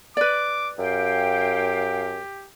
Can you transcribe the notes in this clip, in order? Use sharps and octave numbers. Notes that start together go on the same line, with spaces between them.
B4 D5 D6
F#2 G4 F5 G5